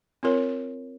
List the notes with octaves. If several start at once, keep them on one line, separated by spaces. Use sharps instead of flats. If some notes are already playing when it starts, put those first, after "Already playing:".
C4 F4 A#4 C#5